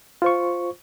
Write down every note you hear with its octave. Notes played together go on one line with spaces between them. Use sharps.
F4 C5 C#6